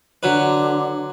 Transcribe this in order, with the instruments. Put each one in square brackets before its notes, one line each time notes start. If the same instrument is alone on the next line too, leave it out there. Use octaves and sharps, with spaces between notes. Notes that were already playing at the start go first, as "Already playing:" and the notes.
[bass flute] D3 [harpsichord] F#3 B4